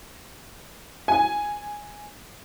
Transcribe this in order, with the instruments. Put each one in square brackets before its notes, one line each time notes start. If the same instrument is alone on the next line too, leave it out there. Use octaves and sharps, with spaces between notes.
[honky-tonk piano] G#5